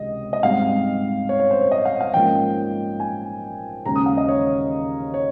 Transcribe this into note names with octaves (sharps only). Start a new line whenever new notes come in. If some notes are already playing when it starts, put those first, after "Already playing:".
Already playing: C#2 C3 D#3 D#5
D#5
G#2 G3 C4 F5
C#5
C#5
C5
C#5
D#5
F5
F5
G#2 F3 A#3 C#4 G5
G#5
D#2 C#3 G#3 C#4 A#5
D#6
F5
D#5
C#5
C#5